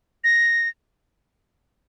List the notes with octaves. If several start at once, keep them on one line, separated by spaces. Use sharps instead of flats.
A#6